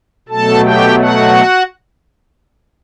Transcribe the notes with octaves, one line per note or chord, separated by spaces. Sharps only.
B2 F#3 A3 A4 A5
G4 G5
F#4 F#5